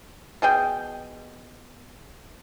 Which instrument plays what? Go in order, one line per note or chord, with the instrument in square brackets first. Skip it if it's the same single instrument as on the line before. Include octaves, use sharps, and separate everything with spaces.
[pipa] B2 G#4 G5